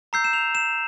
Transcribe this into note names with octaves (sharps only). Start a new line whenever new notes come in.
A#5 E6 G6 C7
E7
F7
E7